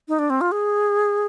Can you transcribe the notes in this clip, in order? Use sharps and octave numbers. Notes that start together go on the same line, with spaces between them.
D#4
D4
C4
F4
G#4